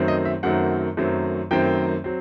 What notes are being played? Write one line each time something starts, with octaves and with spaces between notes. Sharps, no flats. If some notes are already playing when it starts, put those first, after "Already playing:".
Already playing: F#2 D#3 F#3 A3 C4
D#5
E5
F#2 D#3 F#3 A3 C4 F#5
F#2 D#3 F#3 A3 C4
F#2 D#3 F#3 A3 C4 G5
F#3 C4